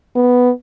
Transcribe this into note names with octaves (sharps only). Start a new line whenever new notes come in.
B3